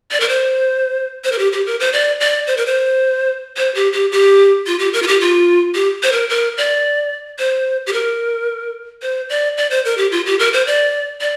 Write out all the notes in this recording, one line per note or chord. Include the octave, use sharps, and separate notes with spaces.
D5
A#4
C5
C5
A#4
G4
G4
A#4
C5
D5
D5
C5
A#4
C5
C5
G4
G4
G4
F4
G4
A#4
F4
G4
F4
G4
C5
A#4
A#4
D5
C5
G4
A#4
C5
D5
D5
C5
A#4
G4
F4
G4
A#4
C5
D5
D5